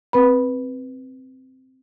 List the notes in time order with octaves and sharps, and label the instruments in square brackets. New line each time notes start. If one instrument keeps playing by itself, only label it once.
[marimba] C4 B4 B5